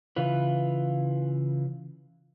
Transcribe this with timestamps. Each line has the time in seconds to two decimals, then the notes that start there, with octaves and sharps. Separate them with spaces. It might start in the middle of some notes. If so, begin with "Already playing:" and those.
0.16 C#3 E3 F4 B4